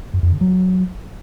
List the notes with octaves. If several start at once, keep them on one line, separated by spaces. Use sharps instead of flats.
F#2
F2
D3
F#3